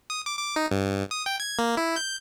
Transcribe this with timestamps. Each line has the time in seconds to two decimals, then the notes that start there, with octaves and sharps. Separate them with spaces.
0.10 D#6
0.26 D6
0.38 D6
0.56 D#4
0.71 G2
1.11 D#6
1.26 G5
1.40 G#6
1.59 A#3
1.77 E4
1.96 G6